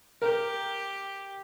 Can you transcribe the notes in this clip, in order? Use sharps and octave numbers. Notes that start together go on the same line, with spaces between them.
G4 A#4